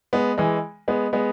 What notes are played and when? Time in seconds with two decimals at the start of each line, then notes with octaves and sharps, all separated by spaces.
0.13 G#3 B3
0.38 E3 G#3
0.88 G#3 B3
1.13 G#3 B3